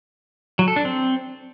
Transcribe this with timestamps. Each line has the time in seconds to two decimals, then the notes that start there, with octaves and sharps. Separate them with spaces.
0.59 F#3
0.68 A4
0.76 D4
0.85 C4